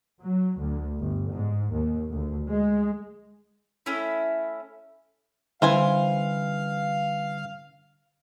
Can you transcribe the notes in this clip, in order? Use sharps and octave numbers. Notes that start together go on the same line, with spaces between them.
F#3
D2
G1
G#2
D#2
D2
G#3
A3 C#4 E4
D3 E3 G3 C#4 C5 F5 G#5